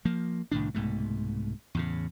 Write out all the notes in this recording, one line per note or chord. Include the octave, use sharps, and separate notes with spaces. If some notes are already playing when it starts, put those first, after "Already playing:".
F3 A#3
C2 A2 D#3 D4
C2 G#2 B2 A3
E2 A2 C#3